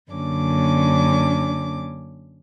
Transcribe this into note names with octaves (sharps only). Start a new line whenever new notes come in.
F#2 D3 A#3 C#4 D4 D6